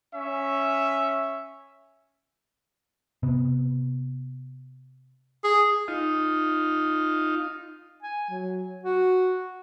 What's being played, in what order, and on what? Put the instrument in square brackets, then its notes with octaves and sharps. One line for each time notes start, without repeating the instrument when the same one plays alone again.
[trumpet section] C#4 E5
[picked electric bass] C3 B3
[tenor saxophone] G#4
[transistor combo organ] D#4 F4
[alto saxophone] G#5
F#3
F#4